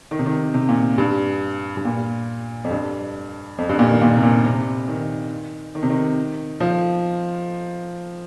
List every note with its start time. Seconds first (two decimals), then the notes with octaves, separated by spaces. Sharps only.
0.11 D#3
0.19 C3
0.26 D#3
0.54 C3
0.69 A#2
0.98 G2
1.77 G2
1.85 A#2
2.64 F2
2.71 G2
3.58 F2
3.69 G2
3.79 A#2
3.90 D#3
4.01 A#2
4.17 C3
4.23 A#2
4.45 C3
4.88 D#3
5.75 D#3
5.83 C3
5.90 D#3
6.60 F3